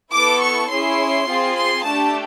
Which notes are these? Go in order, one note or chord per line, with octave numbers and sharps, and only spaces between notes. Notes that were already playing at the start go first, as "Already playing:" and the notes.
B3 E4 A4 D6
C#6
C#4 E4 G#4 C6
C4 F4 G#4
C6
A3 D4 G4 A5